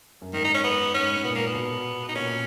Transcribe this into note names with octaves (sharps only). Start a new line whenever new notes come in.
F#2
G#2 D#3
D#4
C#4
B3
G#2 C#4
G#2
A#2 B3
A#3
B3
B2
D#4
A#2 C#4